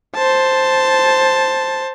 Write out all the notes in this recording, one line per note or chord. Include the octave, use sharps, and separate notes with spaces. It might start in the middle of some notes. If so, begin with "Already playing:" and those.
C5 A5